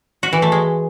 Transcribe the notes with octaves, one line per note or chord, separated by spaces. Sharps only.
F#4
E3
A3
G#3